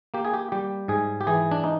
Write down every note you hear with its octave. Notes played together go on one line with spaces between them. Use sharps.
A#3 G4
G#4
G4
G3 G4
G#2 G#4
G4
E3 G#4
D4
D#4